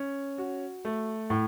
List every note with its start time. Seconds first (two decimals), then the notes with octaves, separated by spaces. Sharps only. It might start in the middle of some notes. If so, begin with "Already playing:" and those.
Already playing: C#4
0.38 F#4
0.85 A3
1.30 A2